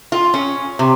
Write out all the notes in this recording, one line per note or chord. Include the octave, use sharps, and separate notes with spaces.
F4
C#4
C3